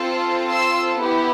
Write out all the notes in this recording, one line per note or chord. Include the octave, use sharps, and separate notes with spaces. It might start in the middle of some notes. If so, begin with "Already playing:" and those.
Already playing: C4 F4 A4
C6 E6
B3 E4 G4